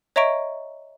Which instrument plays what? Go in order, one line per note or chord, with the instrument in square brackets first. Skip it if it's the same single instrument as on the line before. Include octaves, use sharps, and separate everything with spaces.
[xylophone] C#5 D#5 E5 A#5 C#6 D7